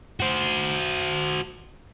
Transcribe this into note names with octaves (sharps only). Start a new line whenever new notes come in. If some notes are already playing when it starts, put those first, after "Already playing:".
F#4 C5